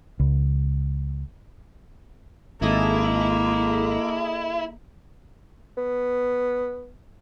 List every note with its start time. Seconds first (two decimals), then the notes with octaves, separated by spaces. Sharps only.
0.20 C#2
2.62 G#1 A#3 E4 G#4 A4 D#5
5.77 B3